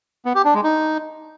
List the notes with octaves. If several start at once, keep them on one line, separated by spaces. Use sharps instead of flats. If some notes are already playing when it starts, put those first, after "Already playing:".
B3
G4
D4
G#3
D#4